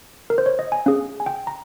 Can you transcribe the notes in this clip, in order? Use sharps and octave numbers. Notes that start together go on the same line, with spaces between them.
A#4
C5
C#5
D#5
G#5
C#4 G#4 F5
G#5
G5
A#5